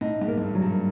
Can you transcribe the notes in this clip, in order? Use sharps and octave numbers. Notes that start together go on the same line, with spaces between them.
A2 D#4
G#2
A#3
G#2
G2
F#3
G2